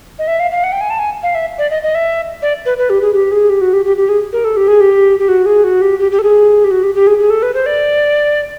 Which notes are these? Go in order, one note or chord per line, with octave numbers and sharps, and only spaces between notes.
D#5
E5
F5
F5
F#5
G5
G#5
A5
G#5
F5
E5
D5
D#5
D#5
E5
D5
B4
B4
G4
G#4
G4
G#4
G4
F#4
G4
G4
G4
G#4
A#4
A4
G4
G#4
G4
G4
F#4
G#4
F#4
G4
G4
G4
A4
G#4
G4
F#4
G4
G4
G#4
G#4
A4
B4
C5
D5